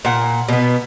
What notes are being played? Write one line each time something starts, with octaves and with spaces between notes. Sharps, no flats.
A#2 F#5
B2 B3